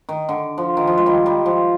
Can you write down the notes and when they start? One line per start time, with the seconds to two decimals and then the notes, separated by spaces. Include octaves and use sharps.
0.09 D#3
0.29 D3
0.58 F3
0.77 D#3
0.87 F3
0.98 G#3
1.06 D#3 G3
1.26 D#3 G3
1.46 F3